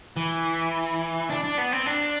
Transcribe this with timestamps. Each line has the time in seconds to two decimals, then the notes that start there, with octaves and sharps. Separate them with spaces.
0.17 E3
1.30 D4
1.44 D4
1.58 B3
1.72 C4
1.86 D4